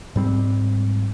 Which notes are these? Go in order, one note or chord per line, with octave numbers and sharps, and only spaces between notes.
G#2 G3 C4